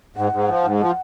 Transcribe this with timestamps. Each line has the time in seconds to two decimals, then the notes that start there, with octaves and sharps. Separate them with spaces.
0.16 G#2 F#5
0.32 G#2
0.49 F3
0.64 G#2
0.80 F3 F#5